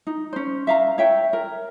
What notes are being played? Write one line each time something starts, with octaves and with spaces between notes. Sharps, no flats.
D#4
C#4 C5
E5 F5 A#5
C#5 E5 G5
A#4